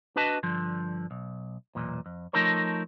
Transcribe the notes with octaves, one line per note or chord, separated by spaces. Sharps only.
D4 F#4 B4 D#5 A5
G2 D3 F3
B1
B1 E2 A#2
F2
F3 A3 D#4 A4 A#4 C#5